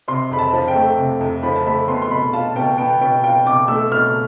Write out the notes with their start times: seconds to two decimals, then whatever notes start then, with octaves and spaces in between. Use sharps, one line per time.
0.08 C3 C6
0.31 F2 B5
0.39 A5
0.53 F3
0.68 G5
0.75 A3
0.98 C3
1.21 F2
1.43 F3 B5
1.56 A5
1.66 A3 B5
1.88 B3 C6
2.02 C6
2.11 B2 B5
2.33 F4 A5
2.56 B2 G5
2.78 B3 G5
3.01 B2 G5
3.24 F4 G5
3.46 B2 D6
3.68 A3 E6
3.91 B2 F6